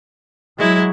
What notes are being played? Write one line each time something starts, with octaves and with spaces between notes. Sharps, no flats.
F#3 G#3 E4